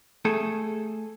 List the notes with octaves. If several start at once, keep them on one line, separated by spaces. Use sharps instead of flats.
A3 G#4 A4